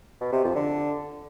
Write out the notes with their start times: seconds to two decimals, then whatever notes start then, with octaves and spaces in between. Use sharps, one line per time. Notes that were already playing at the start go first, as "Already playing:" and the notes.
0.21 B2
0.32 C3
0.44 F2
0.55 D3